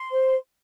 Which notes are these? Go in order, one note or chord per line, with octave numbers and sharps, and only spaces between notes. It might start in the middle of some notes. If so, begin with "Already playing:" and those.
Already playing: C6
C5